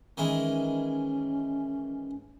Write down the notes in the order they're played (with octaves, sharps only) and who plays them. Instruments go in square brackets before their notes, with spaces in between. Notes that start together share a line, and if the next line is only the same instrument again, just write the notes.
[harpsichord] D#3 E3 G#3 [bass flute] C#4